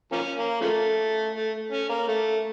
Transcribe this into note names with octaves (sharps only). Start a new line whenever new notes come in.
F3 A#3 C#4
A#3
C#3 F3 A3
A3
C#4
A#3
A3